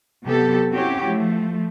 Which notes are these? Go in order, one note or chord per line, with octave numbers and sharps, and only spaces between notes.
C3 F#3 B3 G4 A4
C4 C#4 E4 F#4 G4 C#5
F3 A3